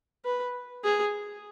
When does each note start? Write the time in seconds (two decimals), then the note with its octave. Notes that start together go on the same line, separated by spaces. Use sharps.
0.25 B4
0.84 G#4